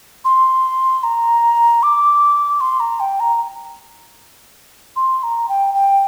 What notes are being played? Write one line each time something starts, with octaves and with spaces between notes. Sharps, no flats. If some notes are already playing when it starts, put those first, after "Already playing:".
C6
A#5
D6
C6
A#5
G5
A#5
C6
A#5
G5
G5